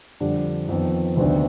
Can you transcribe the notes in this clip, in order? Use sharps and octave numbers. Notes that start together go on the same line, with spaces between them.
F2 D3 G3 D4
F2 D#3 B3
D2 C3 D#3 B3 D4